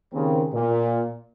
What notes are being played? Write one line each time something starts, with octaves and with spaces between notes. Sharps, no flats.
D#2 C#3 C4 A#4
A#2